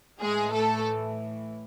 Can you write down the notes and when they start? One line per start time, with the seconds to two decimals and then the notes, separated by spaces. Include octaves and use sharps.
0.21 A2 E3 G#3 G#4
0.53 A3 A4